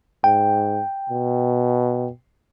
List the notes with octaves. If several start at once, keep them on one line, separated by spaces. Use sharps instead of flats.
G#2 G5
B2